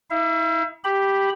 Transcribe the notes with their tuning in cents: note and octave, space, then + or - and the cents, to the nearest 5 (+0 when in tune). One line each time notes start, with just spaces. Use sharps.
E4 -40 E5 +40
G4 +0 B5 +0